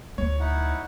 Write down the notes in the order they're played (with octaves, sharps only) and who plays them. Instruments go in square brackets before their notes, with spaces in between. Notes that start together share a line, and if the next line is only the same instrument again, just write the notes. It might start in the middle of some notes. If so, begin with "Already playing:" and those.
[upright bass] D2 [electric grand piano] C#5
[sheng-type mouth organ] D#4 E4 F#5